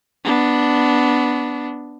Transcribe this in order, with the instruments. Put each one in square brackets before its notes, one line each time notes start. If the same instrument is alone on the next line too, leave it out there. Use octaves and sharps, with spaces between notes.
[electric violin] B3 D4